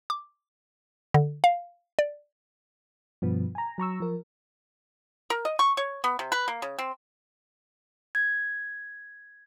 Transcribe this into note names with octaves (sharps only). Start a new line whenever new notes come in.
D6
D3
F5
D5
G2 B2 F3 B3
G#5 A#5
F#3 A#5 C#6 E6
F3 A#4
A#4
D#5
C#6
C#5
B3
C3
B4
A#3
C#3
C4
G#6